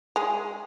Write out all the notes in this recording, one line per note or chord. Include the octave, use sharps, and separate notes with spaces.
G#3 G#4